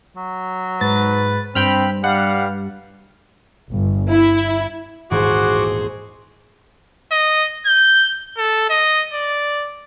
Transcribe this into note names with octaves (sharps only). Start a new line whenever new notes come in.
F#3
G#2 B4 A6
G2 C4 G5 B5 F6
G3 F5 F#5
G1
E4
D#1 A1 G#2 F#4 G#4 C5 F#5 D6
D#5
G6
A4
D#5
D5